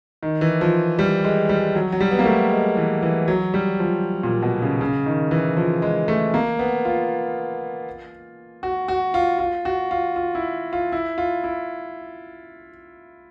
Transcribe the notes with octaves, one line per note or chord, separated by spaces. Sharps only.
D#3
E3
F3
G3
G#3
G3
F#3
F#3
G3
B3
A#3
A3
G#3
E3
E3
F#3
G3
F3
A#2
B2
C#3
C#3
D#3
E3
F3
G#3
A3
A#3
B3
F4
F#4
F#4
F4
F4
F#4
F4
F4
E4
F4
E4
F4
E4